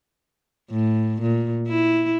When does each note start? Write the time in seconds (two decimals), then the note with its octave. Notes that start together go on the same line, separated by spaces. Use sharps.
0.71 A2
1.21 A#2
1.68 E4